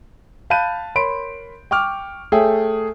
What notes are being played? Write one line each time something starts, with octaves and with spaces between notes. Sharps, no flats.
F5 A5 B5 F#6 G6 D#7
A#4 C#5 B5 C6 D7
G5 C#6 D6 F6
A3 G#4 A4 C#5 E5 G5